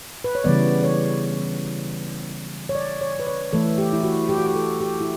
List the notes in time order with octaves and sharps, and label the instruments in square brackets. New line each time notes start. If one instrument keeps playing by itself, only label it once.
[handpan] B4
C#5
C#3 E3 G3 B3 D5
C#5
C#5
D5
C#5
B4
C#5
E3 A3 A4
G4
E4
F#4
G4
F#4
G4
A4
G4
E4